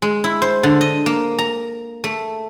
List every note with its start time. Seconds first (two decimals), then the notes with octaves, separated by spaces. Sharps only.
0.02 G#3
0.24 E4
0.42 C5
0.63 D3
0.81 D#5
1.06 A#3
1.38 A#5
2.04 A3